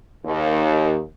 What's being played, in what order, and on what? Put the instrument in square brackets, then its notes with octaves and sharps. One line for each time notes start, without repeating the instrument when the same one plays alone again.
[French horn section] D#2